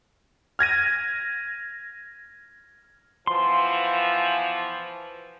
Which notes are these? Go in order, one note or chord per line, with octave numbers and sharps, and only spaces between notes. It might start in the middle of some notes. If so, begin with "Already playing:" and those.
F6 G#6 A#6 D#7
B2 E3 F3 C6